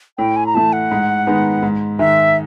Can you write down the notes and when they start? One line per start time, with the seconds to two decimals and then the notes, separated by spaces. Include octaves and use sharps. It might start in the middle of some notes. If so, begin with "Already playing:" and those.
0.18 A2 G5
0.36 G#5
0.46 A#5
0.54 E3 A3 A5
0.73 F#5
0.91 G#2
1.27 D#3 G#3 B3 D#4
1.63 G#2
1.99 D#3 G#3 E5